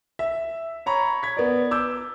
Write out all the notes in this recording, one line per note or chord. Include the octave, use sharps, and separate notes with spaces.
E5
C#5 A#5 B5 C#6
G#6 B6
B3 D5
D6 E6 G6